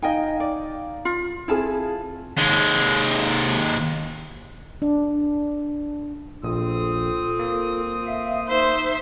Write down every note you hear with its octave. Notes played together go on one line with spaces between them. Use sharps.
D#4 D#5 F5 G5 G#5
D5
F4
C4 E4 F4 G#4 A5
D#2 G#3
D4
A#1 C4 F4 A4 D#6
A#3
E5 F5
D#4 C5 E5